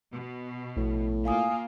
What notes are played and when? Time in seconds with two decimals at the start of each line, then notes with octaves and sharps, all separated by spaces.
0.12 B2
0.77 A#1 A2
1.25 A#3 F4 F5 G#5 D#6